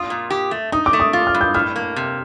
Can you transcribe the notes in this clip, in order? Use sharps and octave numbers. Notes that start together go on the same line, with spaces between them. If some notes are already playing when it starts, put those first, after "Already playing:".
Already playing: F4 D#6
A#2
G4
A3
D#4 D#6
D6
A3
D#6
F4
F6
G2
G6
A2 F6
A#3
C3